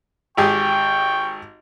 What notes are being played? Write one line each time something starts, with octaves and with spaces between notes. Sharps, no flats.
G#1 G4 G#4 G5 C#6